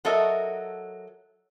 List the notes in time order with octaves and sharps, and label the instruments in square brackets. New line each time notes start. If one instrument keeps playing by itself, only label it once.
[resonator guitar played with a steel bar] F#3 A4 A#4 D#5 E5